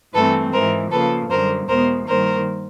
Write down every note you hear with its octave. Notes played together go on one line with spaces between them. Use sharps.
G2 E3 A3 C4 A4 B4
G#2 E3 G#3 A#4 C5
C#3 F3 A#3 A4 B4
F#2 D3 G3 A#4 C5
E2 B2 G#3 B3 A#4 C5
G2 D#3 G3 A#3 A#4 C5